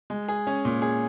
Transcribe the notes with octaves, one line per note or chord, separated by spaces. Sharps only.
G#3
G#4
C#4
A#2
G#4